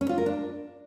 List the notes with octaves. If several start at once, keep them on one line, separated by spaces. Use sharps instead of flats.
C#4
F4
A#4
D4